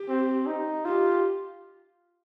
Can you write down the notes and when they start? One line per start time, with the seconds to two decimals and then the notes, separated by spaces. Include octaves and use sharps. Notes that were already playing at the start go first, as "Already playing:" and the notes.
Already playing: G4
0.09 C4
0.46 D#4
0.85 F4 G4